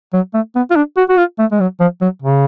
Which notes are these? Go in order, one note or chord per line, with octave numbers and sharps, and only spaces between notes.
F#3
A3
B3
F4
D4
F#4
F#4
F4
A3
G#3
F#3
F3
F#3
C#3